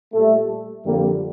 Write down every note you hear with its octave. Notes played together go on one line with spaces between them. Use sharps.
A#2 G3 A3
F2 D3 G3 A#3